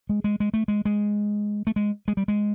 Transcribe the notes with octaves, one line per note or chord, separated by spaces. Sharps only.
G#3
G#3
G#3
A3
G#3
G#3
A3
G#3
G#3
G3
G#3